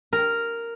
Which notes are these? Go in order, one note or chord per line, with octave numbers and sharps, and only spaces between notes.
A#4